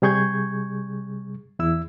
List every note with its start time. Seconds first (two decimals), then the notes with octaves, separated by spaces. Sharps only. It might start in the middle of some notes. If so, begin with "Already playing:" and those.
0.02 C3 G3 G#4 C#6 G6 G#6
1.59 E2 E4 E6